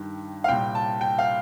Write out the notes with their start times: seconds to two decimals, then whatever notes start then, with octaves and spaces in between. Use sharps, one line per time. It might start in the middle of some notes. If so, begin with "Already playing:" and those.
Already playing: G2 D#3
0.44 F5
0.48 C2 A#2 G5
0.75 A5
1.01 G5
1.19 F5